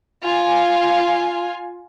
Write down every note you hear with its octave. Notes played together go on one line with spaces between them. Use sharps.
F4 G#5